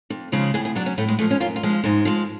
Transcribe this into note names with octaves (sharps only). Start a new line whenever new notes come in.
F2
C#3 F3 G#3
A2 G#4
G#4
F#3 D4
C#4
A2 A3
G#3
F3 G#3 A3
C#4
F#2 F4
F4
F3 G#3
C#4
G#2 G#3
F3 G#3